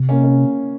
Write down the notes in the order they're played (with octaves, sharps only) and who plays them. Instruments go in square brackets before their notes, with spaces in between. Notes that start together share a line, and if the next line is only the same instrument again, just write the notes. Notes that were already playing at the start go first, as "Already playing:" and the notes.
Already playing: [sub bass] C3
[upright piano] A#3 C#4
C#4